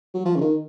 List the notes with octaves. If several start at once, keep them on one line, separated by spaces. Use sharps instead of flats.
F#3
F3
C#3
D#3